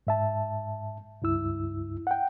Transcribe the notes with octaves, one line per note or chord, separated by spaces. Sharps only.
G#2 E5 A5
C#2 G2 E4 E6
F#5 G5